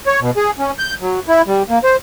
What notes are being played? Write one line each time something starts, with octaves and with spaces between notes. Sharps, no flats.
C#5
B2
G#4
C#4
G6
F#3
E4
G3
A#3
C5